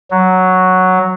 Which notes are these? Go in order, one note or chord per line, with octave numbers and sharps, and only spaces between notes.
F#3